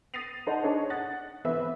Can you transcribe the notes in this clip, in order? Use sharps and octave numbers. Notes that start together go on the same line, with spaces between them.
D#6 A6 A#6 C7 D#7 F7
D#4 C5 F#5 A5
D4 D#4 G#4 C5 C#5
F#5 D#6 F#6 A6
E3 B3 C4 B4 E5